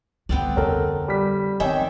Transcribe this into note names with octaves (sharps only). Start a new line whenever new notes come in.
D2 G2 B3 C4 D5
F2 D3 A4 A#4 C#5
G3 B6
D#3 B3 C4 C#5 D#5 E5 G5 G#5